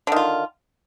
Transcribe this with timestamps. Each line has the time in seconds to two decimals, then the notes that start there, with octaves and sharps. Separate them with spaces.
0.07 D3
0.12 D#3
0.16 F4